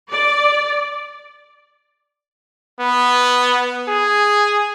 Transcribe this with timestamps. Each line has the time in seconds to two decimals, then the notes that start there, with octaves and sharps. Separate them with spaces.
0.11 D5
2.80 B3
3.88 G#4